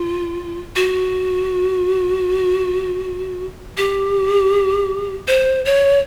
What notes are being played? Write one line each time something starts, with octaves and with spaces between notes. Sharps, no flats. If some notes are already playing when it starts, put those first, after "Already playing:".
Already playing: F4
F#4
G4
C5
C#5